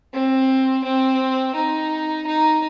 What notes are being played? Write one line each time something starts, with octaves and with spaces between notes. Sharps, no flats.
C4
C4
D#4
D#4